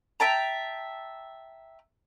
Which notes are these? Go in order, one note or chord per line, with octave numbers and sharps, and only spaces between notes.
E5 G5 A5 A#5